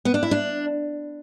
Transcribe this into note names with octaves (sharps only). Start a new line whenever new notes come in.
B3
D4
E4
D4